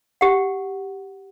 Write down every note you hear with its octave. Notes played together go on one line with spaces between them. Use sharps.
G4 F#5